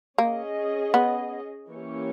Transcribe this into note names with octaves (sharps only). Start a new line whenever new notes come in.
A#3 C#4 G#4 D#5
B3
E3 A#3 C#4 G4 C#5